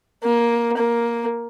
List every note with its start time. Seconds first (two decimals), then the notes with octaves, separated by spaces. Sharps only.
0.23 A#3
0.77 A#3